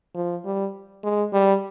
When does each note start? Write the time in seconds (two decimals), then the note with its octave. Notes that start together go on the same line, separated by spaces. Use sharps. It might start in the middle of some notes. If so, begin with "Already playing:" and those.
0.15 F3
0.45 G3
1.04 G#3
1.33 G3